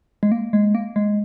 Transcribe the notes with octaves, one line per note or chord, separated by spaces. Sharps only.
G#3
A#3
G#3
A#3
G#3